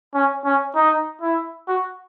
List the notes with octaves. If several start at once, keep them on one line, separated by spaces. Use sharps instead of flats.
C#4
C#4
D#4
E4
F#4